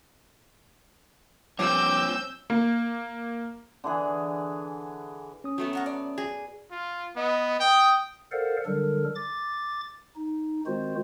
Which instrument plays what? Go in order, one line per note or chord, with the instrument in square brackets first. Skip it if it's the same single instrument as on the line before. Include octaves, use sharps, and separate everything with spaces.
[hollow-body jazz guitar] G2 F3 [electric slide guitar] C4 C5 C#5 [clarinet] D6 [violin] E6 G6
[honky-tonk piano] A#3
[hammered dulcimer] D3 E3 G#4
[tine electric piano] C#4 D#6
[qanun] F#3 A3 B3
[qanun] B3 [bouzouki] A#4 F#5 A#5
[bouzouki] D5
[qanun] G#4
[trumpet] F4
[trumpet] B3 [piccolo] D#5
[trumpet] G5 [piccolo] D#6
[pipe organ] A4 A#4 C5 D5 F5 F#5
D3 F#3 G3 D4 A4 A#4
D6 A6
D#4
D#3 G#3 C4 F4 F#4 C5